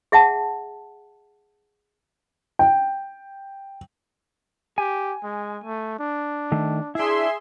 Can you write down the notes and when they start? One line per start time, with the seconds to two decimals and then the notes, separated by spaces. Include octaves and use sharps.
0.12 G#4 E5 F#5 A5
2.59 G5
4.78 G4 G#5
5.23 G#3
5.64 A3
5.99 D4
6.52 D#3 A3
6.95 D4 E4 G#4 E5 C6